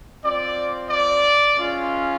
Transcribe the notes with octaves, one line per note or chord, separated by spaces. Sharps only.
C4 F4 D5
D5
G#3 C#4 F4